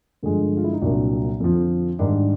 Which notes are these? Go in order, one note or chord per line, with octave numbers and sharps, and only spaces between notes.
G2 D3 F3 G#3
F4
E4
D#4
C2 A#2 F#3 D4
F2 D3 F3
G#2 D#3 G3 D4